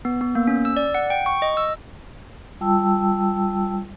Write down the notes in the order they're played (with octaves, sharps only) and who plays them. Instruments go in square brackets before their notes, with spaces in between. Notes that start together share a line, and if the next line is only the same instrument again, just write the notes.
[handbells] B3
B3
A#3
C#4
E6
D5
F#5
G5
C#6
D#5
E6
[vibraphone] G3 F4 G5 A5 E6